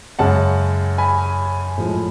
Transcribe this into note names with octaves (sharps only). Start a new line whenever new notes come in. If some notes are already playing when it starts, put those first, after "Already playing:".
F#2 C#3 G#3 F#5 A5
G#5 B5
A2 F3 G#3